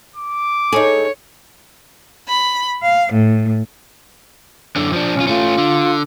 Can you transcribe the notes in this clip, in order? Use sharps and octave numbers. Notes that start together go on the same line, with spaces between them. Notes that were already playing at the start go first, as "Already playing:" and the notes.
D6
D#4 G#4 A4 C#5
B5
F5
A2
F#2 D3
F3 D4
B1 C#4 F4
A3 C#4 F4
D3